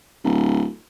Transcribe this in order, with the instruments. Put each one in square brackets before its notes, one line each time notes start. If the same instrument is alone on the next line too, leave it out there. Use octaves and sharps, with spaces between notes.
[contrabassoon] D1